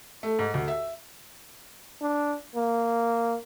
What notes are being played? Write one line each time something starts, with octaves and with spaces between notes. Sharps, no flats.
A3
G#2
D2
E5
D4
A#3